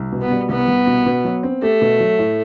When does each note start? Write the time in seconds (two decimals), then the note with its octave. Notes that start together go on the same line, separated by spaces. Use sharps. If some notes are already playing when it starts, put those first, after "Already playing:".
Already playing: C2
0.12 B2
0.21 B3
0.31 G3
0.49 C2 B3
0.68 C2
0.87 B2
1.06 B2
1.25 F#3
1.43 C4
1.62 A3 G4
1.82 B2
2.00 F#3
2.19 A2